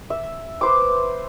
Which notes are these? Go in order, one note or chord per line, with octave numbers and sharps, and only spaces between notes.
E5
B4 C5 D6